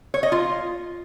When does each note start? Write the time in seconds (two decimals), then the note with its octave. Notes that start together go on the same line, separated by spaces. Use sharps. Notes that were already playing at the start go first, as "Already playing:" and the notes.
0.14 C#5
0.23 D#5
0.32 F4